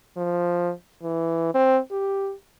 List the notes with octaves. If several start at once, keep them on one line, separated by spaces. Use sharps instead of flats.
F3
E3
C4
G4